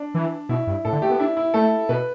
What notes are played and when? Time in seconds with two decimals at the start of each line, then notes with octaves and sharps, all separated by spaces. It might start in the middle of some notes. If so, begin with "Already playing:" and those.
Already playing: D4
0.14 E3
0.49 B2 E4
0.67 G2
0.85 A2 A4
0.93 D3
1.02 A3 G4
1.10 B3
1.19 D4 E4
1.37 E4
1.54 A3 A4
1.89 B2 B4